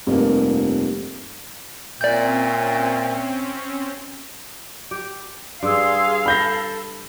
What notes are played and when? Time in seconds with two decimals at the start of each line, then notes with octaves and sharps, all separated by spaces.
0.07 F1 G2 A#3
2.01 A#2 C4 C#4 D5 E5 G5 G6
4.91 G4
5.63 G2 G#4 F5 C6 E6
6.26 A4 B5 G6 A#6